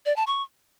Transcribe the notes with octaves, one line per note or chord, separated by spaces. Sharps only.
D5
A5
C#6